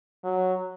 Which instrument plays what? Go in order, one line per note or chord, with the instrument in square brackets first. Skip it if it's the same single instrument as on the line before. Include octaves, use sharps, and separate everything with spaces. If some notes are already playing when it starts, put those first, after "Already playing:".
[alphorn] F#3